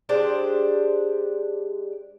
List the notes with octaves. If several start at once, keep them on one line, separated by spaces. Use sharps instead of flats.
G#3 D4 G4 C5